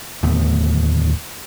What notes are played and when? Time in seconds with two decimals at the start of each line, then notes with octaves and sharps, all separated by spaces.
0.23 D1 D#2 A3 B3